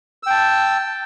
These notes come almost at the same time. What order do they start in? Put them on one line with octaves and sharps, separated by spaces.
E6 G5 A5